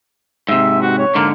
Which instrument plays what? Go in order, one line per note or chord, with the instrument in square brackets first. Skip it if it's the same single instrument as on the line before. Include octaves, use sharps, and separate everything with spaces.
[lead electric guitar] G#2 C3 [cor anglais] E5
[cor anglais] F#4
C#5
[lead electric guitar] G#2 D3 [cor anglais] A#3